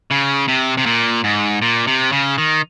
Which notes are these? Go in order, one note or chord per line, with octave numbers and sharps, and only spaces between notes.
C#3
C3
C3
A#2
G#2
A#2
C3
C#3
D#3